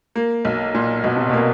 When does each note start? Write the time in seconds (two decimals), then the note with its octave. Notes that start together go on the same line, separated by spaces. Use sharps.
0.16 A#3
0.45 B1
0.74 A#2
1.03 B1 B2
1.16 C3
1.29 B2
1.33 A#3